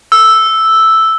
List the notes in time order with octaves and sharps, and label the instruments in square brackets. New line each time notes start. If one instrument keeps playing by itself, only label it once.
[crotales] E6